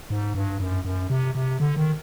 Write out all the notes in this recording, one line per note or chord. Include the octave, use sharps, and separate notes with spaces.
G#2
G2
F#2
F#2
C3
C3
D3
D#3